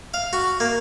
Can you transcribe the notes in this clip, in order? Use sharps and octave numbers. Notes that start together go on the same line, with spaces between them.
F5
F#4
A#3